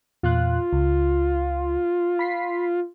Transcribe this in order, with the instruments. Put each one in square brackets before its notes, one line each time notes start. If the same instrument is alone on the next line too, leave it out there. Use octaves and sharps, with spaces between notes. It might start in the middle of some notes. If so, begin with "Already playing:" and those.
[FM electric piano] E2 A#2 F#6 [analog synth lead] F4
[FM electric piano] C#2
B5 B6 C7